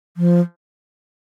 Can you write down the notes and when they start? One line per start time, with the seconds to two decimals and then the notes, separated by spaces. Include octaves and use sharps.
0.17 F3